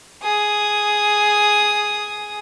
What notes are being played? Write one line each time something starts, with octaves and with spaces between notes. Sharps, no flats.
G#4 D#6